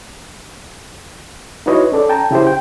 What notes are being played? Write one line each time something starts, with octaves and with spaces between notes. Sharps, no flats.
D#4 E4 F#4 B4 C#5 D#5
C#4 A4 D5
G5 A5 A#5
C#3 E4 G4 C5
G5